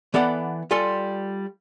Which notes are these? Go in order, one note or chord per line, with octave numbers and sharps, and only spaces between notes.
E3 B3 A4 D5 F#5
G3 F4 A4 G#5 C6